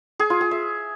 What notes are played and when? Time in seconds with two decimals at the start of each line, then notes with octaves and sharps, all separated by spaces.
0.20 G#4
0.30 F4
0.41 G#4
0.51 E5